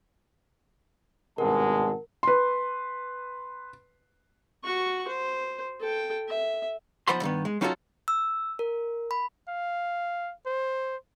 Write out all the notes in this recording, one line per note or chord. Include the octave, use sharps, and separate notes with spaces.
G#1 G2 B2 G#3 A#4 F#5 A5
B4 C6
F#4 C#6
C5
A4 G5
E5
B1 F3 C5 F#5 B5 C6
G2 D#3 B3
G#3
F#3 C#4 D#4 F4 F#4 A4
E6
A#4
B5
F5
C5